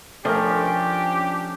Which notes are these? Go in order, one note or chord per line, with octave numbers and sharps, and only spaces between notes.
F3 A3 C#4 D4 G4 A#4